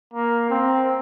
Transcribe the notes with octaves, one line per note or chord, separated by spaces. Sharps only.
A#3
C4